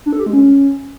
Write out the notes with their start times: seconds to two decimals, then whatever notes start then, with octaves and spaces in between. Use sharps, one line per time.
0.06 D4
0.13 A4
0.19 G4
0.26 G#3
0.33 C#4